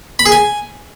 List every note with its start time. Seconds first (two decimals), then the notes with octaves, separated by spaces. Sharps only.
0.19 B5
0.26 G#4
0.32 G#5